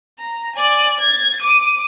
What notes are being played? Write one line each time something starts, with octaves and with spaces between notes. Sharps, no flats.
A#5
D5 G#5
G#6 A6
D6 D#7